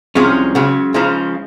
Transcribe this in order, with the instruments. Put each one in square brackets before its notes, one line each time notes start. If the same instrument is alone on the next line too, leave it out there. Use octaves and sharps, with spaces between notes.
[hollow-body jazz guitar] C2 C3 F3 G#3 C#4 G#4
C#2 C#3 F#3
C#2 C#3 F3 G#3 D#4